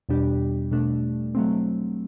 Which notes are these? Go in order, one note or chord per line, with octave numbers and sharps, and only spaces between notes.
E2 B2 G3 D4 G4
B2 A3 D4
F#3 A3 C4